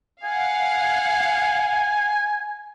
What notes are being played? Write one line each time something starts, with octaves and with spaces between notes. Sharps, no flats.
F5 F#5 G#5